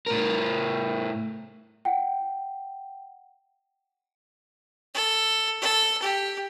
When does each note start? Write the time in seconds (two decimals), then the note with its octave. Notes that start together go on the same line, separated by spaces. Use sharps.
0.06 A2 A#4
1.85 F#5 G5
4.94 A4
5.61 A4
6.02 G4